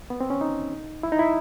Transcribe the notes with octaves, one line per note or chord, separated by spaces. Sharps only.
B3
C4
C#4
D#4
E4
D#4
E4